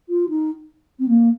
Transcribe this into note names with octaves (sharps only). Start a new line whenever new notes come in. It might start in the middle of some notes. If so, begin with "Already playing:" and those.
F4
D#4
C4
A#3